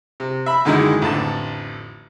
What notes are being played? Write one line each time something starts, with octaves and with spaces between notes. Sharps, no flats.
C3
E5 B5
F#2 D3 D#3 G#3 D#4 E4
A1 F2 D3 A5